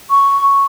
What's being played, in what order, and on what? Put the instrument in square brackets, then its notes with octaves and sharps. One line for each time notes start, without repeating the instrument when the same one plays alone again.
[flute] C#6